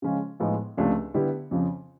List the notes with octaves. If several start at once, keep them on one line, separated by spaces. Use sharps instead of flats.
C#3 F3 G#3 C#4 F4
A2 F3 G#3 B3 D#4
C#2 C3 F3 A3 D4
D3 G3 B3 E4 G4
F2 C#3 F3